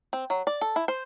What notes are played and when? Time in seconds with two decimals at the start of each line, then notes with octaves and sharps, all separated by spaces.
0.13 C4
0.30 F#3
0.47 D5
0.61 A4
0.76 E4
0.88 C5